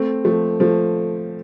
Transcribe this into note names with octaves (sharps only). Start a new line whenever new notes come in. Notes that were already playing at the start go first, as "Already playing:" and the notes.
Already playing: A3 C4
F3 A3
F3 A3